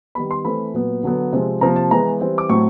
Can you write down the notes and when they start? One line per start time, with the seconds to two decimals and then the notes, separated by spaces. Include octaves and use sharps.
0.15 D#3 G3 B3 B5
0.31 C6
0.45 E3 A3 C4 B5
0.74 A#2 F#3 B3
1.03 D3 F#3 B3
1.33 C3 F3 G#3 C4
1.61 C3 F3 A#3 A#5
1.76 A5
1.91 E3 G#3 B3 A#5
2.21 E3 G3 C4
2.38 D6
2.49 A2 F#3 A3 C4 C#6